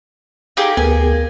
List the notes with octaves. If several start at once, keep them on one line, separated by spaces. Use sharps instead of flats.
D#4 G4 G#4 F5
D2 B3 G#4 A#4 G#5